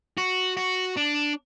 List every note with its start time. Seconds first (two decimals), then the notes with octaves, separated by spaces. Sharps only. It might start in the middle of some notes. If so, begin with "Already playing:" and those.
0.18 F#4
0.57 F#4
0.97 D4